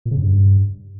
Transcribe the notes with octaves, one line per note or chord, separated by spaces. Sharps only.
A#2
C#3
F#2
G2